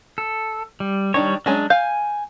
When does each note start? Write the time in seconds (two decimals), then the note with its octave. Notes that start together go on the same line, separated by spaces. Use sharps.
0.18 A4
0.80 G3
1.14 D#3 G3 D4 C#5
1.46 F#3 G#3 C#4 D4
1.70 F5 G#5 G6